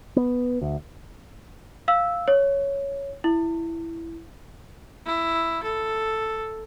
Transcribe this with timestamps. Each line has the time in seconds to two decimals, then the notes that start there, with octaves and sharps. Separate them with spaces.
0.16 B3
0.61 D2
1.88 F5 E6
2.28 C#5
3.24 E4
5.05 E4
5.63 A4